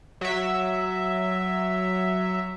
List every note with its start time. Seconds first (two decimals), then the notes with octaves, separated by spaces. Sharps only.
0.21 F#3 E5